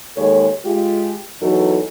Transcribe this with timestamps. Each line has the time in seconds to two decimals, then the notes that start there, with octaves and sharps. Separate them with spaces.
0.17 D#2 G#3 A4 C#5
0.66 G#3 F4 G4
1.42 E2 E3 F#3 D#4 F#4 A4